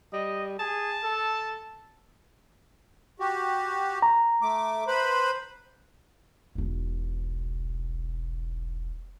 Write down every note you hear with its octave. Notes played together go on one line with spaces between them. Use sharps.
G3 D#5
G#4 A5
A4
F#4 G4
A#5
A3 D6
B4 C5 B5
E1 B1